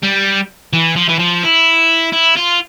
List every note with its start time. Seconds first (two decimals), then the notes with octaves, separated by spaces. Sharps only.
0.03 G3
0.73 E3
0.96 F3
1.09 E3
1.19 F3
1.43 E4
2.13 E4
2.37 F4